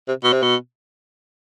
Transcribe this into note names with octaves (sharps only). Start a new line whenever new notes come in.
C3
B2
C3
B2